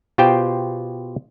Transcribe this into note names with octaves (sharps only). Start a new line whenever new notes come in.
B2 F4 G4 C5 G5